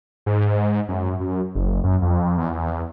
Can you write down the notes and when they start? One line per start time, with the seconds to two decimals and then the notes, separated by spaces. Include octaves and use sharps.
0.26 G#2
0.89 F#2
1.20 F#2
1.55 F#1
1.84 F#2
2.02 F2
2.37 E2